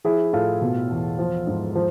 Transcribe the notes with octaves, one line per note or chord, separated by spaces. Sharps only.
F3 E4 G#4
A2 F4 A4
B2
E2
F3
G#2
F3